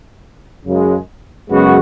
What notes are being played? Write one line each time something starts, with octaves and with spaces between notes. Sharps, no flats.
F#2 C#3 G#3
F#2 C#3 G#3 B3 F#4